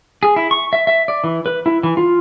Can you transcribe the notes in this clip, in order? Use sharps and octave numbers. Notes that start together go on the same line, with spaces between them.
G#4
E4
C#6
E5
E5
D5
E3
B4
E4
E3
F4